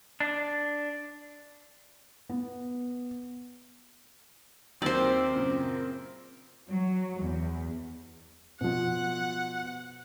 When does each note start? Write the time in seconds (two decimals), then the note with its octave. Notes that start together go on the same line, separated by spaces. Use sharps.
0.20 D4
2.29 B3
4.82 D#2 F#3 A#3 C4 A#4 C5 D5 E5
5.34 F#2 A#2 C#3
6.69 F#3
7.20 E2
8.61 B2 F3 F#5